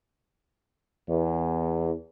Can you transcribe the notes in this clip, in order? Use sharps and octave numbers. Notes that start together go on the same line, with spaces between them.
E2